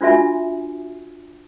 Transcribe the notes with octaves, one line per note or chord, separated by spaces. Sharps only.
D4 F4 F#4 E5 G#5